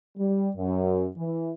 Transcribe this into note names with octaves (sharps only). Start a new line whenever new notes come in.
G3
F#2
E3